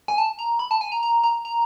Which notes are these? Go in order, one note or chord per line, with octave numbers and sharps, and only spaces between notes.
G#5
A5
A#5
B5
A5
G#5
A#5
A#5
A#5
A#5